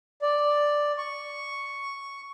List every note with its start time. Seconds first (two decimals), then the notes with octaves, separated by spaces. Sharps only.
0.22 D5
0.98 C#6